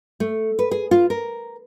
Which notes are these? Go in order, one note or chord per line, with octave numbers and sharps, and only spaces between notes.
A3
B4
G#4
F4
A#4